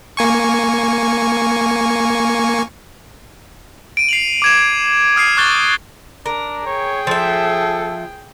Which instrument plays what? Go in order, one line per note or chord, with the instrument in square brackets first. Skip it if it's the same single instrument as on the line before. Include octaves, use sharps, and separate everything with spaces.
[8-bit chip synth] A#3 G#5 C#6
[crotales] D7 D#7
C7 F7 F#7
D6 G#6 E7
D#6 F6 G#6 C7 D#7
C#6 D6 F#6 G6 A6 G7
[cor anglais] D4 [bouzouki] A#4
[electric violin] G#4 G5 [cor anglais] C#5
[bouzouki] F3 E5 [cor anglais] A4